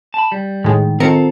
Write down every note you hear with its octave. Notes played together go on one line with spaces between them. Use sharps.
A5 B5
G3
A2 D#3 G#3
D#3 C4 F4 A4 A#4 C#7